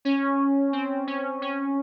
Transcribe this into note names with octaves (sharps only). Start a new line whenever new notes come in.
C#4
C4
C#4
C#4